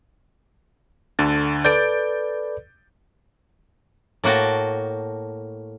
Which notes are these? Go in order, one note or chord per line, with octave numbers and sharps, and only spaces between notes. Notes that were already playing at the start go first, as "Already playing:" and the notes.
D2 D3 A6
A4 B4 D5 G6 A6 D7
A2 A#3 F#4 G5 A5